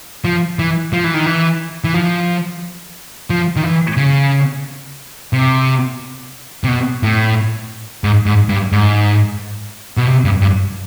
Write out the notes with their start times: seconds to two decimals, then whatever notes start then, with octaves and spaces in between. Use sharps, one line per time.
0.25 F3
0.59 E3
0.93 F3
1.04 E3
1.14 D#3
1.26 E3
1.84 E3
1.94 F3
3.30 F3
3.56 D#3
3.63 E3
3.97 C#3
5.33 C3
6.64 C3
6.68 B2
7.03 A2
8.04 G#2
8.26 G#2
8.49 G2
8.72 G#2
9.97 B2
10.07 C3
10.25 G2
10.41 G2